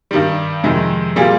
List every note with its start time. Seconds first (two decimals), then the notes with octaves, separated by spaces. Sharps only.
0.11 G2 D#3 G3
0.63 F2 C3 D#3 G#3
1.16 A#2 G3 A#3 F4 G#4